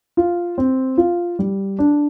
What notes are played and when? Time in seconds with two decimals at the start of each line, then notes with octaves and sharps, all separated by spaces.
0.17 F4
0.58 C4
0.98 F4
1.39 G3
1.79 D4